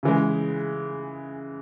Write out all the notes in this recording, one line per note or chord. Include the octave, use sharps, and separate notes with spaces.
C#3 E3 G#3